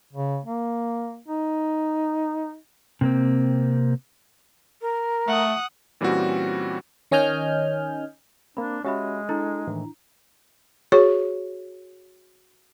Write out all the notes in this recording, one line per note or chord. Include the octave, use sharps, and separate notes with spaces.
C#3
A#3
D#4
C3 A#3 C4
A#4
A3 F#5 D#6
A#2 E3 G3 C4 C#4 F#4
D#3 C#4 D#5 G#5 F6 G6
A#3 C4 D4 B5
G#3 C#4 F#4 G4 E5 B5
D4 E4 A4 A#5
A2 D#3 E3
F#4 G#4 C#5 C#6